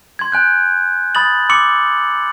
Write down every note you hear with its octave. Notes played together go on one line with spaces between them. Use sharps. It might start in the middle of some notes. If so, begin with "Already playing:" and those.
C6 G#6
G#5 F#6 G6
B5 D#6 A6 F#7
C6 D6 E6 C#7 F#7